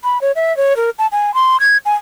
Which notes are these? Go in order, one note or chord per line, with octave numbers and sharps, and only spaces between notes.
B5
C#5
E5
C#5
A#4
A5
G#5
C6
G#6
G#5